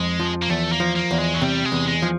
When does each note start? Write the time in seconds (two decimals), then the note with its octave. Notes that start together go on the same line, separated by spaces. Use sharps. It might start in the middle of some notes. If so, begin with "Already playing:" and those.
Already playing: F2 G#3
0.19 F3
0.42 A#3
0.50 E2 A3
0.72 A#3
0.80 F3
0.96 A#3
1.11 E2
1.18 G#3
1.34 F#3
1.41 C3 G3
1.65 G#3
1.72 E2
1.87 G#3
2.02 F3